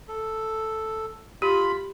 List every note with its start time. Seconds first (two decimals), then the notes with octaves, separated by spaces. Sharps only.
0.08 A4
1.42 F4 G4 B5